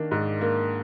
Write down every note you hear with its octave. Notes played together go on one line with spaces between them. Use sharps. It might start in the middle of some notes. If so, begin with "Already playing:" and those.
Already playing: D#3 A#3 D4
G#2
A#3